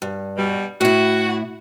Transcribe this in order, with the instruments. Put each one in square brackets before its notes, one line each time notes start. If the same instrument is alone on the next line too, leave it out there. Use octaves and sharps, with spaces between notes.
[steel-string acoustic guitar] G2
[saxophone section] B2 G3
[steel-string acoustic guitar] A2 E4 [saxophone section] F#4